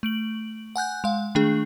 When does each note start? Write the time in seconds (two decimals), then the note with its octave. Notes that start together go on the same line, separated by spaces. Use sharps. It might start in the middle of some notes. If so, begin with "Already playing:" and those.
0.03 A3 D7 F#7
0.76 F#5 G#5 F#6 G6
1.04 G#3 F5
1.35 D#3 A3 D4 G#4